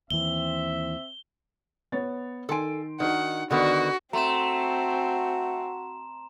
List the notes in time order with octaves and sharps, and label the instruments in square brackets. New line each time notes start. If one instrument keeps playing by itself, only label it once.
[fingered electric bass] D#2 E3 [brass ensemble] C4 E5 [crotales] G7
[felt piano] B3 C#5 A6
[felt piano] D#3 C6 D7 [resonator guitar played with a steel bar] A4 G#5
[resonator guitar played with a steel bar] D#3 [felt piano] D4 D#4 F#4 [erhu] F#5
[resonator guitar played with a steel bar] D3 D#3 B3 [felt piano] D4 A4 [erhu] F#4
[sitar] A3 [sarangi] C4 [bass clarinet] F#4 [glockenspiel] A#5 C6 E7